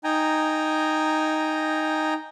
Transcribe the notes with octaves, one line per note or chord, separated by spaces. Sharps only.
D#4 G5 G#5 A#5